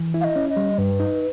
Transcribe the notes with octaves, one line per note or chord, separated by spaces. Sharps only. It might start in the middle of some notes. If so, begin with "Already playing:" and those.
Already playing: E3
E4
F5
D#5
C#4
D#5
G3
G2 B4
D#4